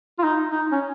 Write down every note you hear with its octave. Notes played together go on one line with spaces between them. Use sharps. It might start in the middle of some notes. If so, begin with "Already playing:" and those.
F4
D#4
D#4
C#4